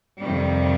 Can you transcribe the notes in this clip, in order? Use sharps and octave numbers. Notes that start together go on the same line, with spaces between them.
F2 C3 D#3 G3